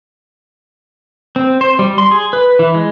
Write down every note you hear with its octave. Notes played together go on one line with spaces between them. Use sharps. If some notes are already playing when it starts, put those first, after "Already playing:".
C4
C5
G3
C6
G#4
B4
E3
G#3